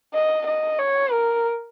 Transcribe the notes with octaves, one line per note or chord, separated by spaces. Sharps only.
D#5
D#5
C#5
A#4